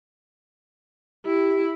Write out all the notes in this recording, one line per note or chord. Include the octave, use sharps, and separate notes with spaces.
E4 G4